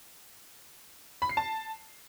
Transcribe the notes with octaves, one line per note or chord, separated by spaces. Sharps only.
B5
C7
A5